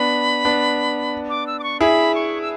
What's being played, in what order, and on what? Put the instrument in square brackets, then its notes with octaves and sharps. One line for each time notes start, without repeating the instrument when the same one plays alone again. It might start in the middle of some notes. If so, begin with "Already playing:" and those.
Already playing: [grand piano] B3 D4 [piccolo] B5
[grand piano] B3 D4
[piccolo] D6
E6
D6
C#6
[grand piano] E4 G#4 [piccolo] B5
[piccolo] C#6
E6